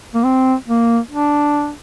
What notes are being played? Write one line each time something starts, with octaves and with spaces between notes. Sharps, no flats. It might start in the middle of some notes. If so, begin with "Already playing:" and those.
A#3
C4
A#3
D4